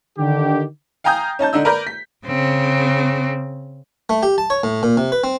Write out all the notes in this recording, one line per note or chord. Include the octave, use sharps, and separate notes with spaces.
D3 D#3 G4
F5 G5 G#5 A#5 D#6 G6
C#4 D#4 A5 G6
D3 D4 D#4 E6
A#4 B4 D5 A#5 G6
B6
C#3 C4
A3
G4
A5
C#5
A2
A#2
C3
B4
C4